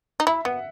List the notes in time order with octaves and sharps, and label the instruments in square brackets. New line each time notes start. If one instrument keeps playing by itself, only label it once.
[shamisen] D#4
[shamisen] E4 [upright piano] E5
[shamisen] B3 [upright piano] F#5